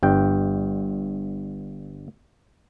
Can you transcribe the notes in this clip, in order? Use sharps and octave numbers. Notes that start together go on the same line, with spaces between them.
G1 G2 G5